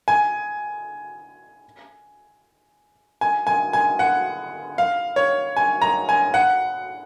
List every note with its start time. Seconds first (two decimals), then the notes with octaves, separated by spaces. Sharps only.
0.08 G#5
3.21 G#5
3.47 G#5
3.73 G#5
3.99 F#5
4.78 F5
5.16 C#5
5.56 G#5
5.82 A#5
6.09 G#5
6.34 F#5